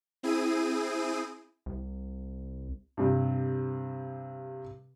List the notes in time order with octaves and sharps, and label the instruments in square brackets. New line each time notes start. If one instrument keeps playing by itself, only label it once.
[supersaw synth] C4 E4 G#4 D#7
[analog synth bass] C2
[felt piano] G2 C3